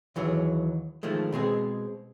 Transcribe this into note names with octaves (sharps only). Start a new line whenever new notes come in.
D#2 E3 F#3 G#4
D#3 F3 G#3 A3
B2 G#3 C4 G#4